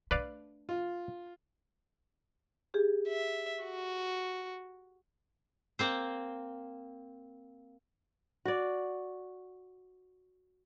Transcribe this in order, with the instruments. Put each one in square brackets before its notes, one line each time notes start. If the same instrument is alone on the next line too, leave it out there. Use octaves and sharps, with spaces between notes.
[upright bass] A3 D4 [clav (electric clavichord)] B4 D5 F5
[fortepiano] F4
[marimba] G4 G#4
[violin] E5
F#4
[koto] A#3 C4 C5
[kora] F#4 D5